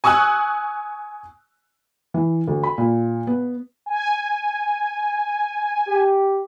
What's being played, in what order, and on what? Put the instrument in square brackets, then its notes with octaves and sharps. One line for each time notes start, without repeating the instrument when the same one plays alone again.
[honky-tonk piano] G#5 C#6 D#6 E6 F#6
[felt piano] E3
D2
B5
A#2
B3
[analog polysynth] G#5
[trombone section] G4